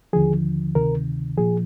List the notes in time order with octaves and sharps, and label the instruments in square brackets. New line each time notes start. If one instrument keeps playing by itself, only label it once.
[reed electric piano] D#2 D3 F3 G#4
D2 C3 D#3 A#4
A#2 F3 G#4